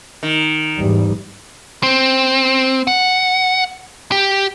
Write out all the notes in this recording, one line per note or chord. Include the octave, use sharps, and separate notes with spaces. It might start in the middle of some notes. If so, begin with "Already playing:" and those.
D#3
E2 G#2 G3
C4
F#5
G4